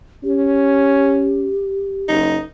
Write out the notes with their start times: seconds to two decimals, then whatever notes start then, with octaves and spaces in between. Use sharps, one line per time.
0.24 C#4 G4
2.08 F#1 D#4